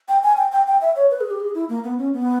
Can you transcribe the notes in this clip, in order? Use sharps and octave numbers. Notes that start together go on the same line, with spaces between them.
G5
G#5
G5
G5
G5
E5
C#5
B4
G#4
G4
G#4
E4
A#3
B3
C#4
B3